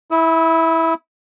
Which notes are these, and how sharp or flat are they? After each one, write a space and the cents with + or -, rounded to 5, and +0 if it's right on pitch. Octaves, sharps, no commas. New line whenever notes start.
E4 -10 E6 -40